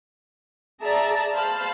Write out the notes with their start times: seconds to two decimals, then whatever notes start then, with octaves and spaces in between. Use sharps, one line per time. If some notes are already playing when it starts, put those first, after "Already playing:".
0.83 G#4 D5 E5 A5 A#5
1.35 C5 F5 A5 B5